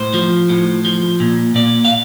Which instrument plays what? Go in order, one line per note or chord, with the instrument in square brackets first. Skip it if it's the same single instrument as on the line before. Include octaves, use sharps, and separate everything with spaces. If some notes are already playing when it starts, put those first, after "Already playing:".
Already playing: [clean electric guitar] A2 C5
F3
A2
F3
A#2
A#2 D5
F5